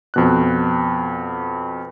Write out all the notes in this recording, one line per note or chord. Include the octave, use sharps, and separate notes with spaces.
F2 B2 F#6